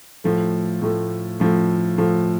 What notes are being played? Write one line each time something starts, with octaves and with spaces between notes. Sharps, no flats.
A2 F3 A3
A2 F3 A3
A2 F3 A3
A2 F3 A3